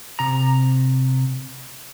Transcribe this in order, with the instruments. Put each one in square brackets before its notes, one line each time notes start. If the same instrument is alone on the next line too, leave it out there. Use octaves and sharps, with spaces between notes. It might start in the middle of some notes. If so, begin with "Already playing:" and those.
[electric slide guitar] C3 A#5